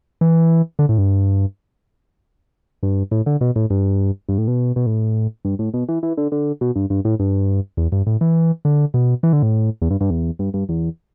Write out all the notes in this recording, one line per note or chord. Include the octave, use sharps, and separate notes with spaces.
E3
D3
A2
G2
G2
A2
D3
B2
A2
G2
G2
A2
B2
B2
A2
G2
A2
B2
E3
E3
D3
D3
B2
G2
G2
A2
G2
E2
G2
A2
E3
D3
B2
E3
D3
A2
E2
G2
G2
E2
G2
G2
E2